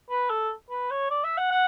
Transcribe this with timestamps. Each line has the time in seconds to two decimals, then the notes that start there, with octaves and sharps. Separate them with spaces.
0.10 B4
0.30 A4
0.70 B4
0.91 C#5
1.11 D5
1.24 E5
1.38 F#5
1.52 F#5